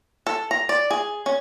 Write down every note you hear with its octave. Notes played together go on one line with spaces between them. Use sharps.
A4
A#5
D5
G#4
C#4